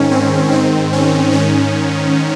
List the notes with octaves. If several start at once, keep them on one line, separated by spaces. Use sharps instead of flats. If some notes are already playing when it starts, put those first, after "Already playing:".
Already playing: G#2 D#3 C#4
C4
G#2 D#3 C4
C#4
G#2 D#3 C#4